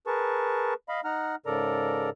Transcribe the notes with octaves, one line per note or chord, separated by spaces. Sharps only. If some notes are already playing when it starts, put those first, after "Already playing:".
G#4 A#4 B4 A5 C#6
D#5 F5 B5
D#4 F#5 A#5 F6
G#2 C#3 A4 A#4 D5 A#5